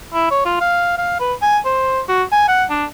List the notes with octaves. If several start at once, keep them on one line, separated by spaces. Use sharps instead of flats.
E4
C#5
F4
F5
F5
B4
G#5
C5
F#4
G#5
F#5
D4